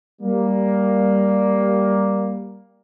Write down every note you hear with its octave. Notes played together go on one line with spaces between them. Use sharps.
G3 A#3